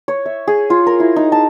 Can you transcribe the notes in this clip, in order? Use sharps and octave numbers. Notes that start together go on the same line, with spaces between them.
C#5
E5
G#4
F4
A#4
E4
D#4
A5